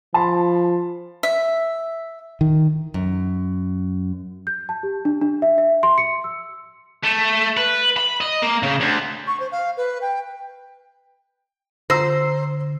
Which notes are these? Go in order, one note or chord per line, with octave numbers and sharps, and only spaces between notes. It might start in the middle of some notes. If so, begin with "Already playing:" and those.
F3 A5 B5 C6
E5
D#3
F#2
G6
A5
G4
D4
D4
E5
E5
C6
C#7
E6
A3
B4
B5
D#5
A#3
C#3
D2
C#6
C5
F5
B4
G5
D3 C5 A#5 E6 A#6